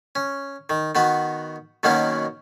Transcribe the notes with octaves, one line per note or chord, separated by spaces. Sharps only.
C#4
D#3
D#3 B3 F#4
B2 D#3 F#3 A#3 B3 C#4